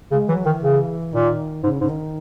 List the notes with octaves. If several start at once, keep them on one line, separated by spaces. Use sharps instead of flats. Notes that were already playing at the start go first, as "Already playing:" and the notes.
C#3 G#3
E3 F#3
D#3 E3
C#3
A#2 D#3
G#2 C#3
G#2 C#3
D#3